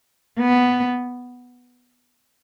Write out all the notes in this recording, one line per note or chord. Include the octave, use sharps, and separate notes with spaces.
B3